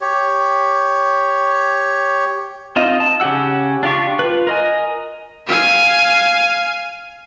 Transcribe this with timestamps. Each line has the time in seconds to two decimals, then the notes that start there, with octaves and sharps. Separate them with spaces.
0.01 G4 C#5
2.76 C4 D#4 F4 D#5
3.00 A5
3.20 C#3 C#4 G4 F#5 E6
3.83 D4 F4 G4 C#6
4.19 F4 B4
4.47 A#4 D#5 G#5
5.47 F5 G#5